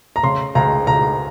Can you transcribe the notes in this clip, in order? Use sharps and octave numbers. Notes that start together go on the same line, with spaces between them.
A#5
C#3 C6
C#2 A#5
C#2 A#5